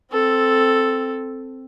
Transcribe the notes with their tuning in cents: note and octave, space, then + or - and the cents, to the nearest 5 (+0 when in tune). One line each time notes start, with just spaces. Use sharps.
C4 +0 A4 +0